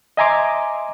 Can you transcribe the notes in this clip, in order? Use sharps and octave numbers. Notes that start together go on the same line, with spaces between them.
D#5 E5 G#5 A#5 C6 D6